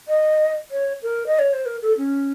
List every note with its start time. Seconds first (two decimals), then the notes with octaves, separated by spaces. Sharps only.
0.08 D#5
0.71 C#5
1.02 A#4
1.27 D#5
1.39 C#5
1.53 C5
1.66 A#4
1.82 A4
1.98 C#4